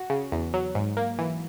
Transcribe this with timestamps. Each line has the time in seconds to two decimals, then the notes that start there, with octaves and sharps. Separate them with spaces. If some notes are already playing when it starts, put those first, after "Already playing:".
Already playing: F#4
0.10 C#3
0.32 E2
0.54 F#3
0.75 G#2
0.97 A#3
1.19 E3